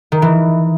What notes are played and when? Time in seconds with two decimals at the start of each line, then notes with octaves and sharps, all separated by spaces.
0.12 D#3
0.22 E3